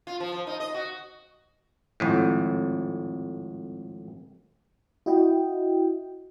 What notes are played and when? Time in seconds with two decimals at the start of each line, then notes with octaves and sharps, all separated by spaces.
0.07 F4
0.20 F3
0.32 F3
0.47 D#4
0.60 D#5
0.74 F#4
2.00 G#1 F2 A2
5.06 E4 F#4 D#5 G5